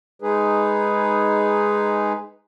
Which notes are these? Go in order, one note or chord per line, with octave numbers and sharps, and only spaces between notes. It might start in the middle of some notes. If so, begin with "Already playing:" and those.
G#3 D#4 G#4 B4